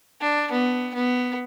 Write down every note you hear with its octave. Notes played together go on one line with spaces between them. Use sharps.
D4
B3
B3